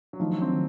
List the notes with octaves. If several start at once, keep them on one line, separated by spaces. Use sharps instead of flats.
F#3
D#3 F3 A3 D#4
F#3
C4
D#3